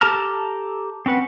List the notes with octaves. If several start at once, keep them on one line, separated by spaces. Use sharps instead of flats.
G4 A4 A5 A#5 F6
C4 C#4 B4 F#5